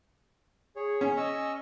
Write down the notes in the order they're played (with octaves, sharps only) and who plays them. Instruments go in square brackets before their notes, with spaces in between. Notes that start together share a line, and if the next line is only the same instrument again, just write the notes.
[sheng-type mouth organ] G#4 C#5
[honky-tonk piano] C#4
[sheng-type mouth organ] D#5 C#6 E6